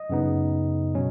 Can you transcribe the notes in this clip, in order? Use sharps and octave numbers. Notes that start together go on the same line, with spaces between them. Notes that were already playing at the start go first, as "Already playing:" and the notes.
Already playing: D#5
F#2 C#3 B3 D#4
B2 F#3 C#4